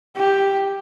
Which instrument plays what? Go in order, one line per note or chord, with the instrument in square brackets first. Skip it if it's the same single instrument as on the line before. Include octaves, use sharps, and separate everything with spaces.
[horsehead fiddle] G4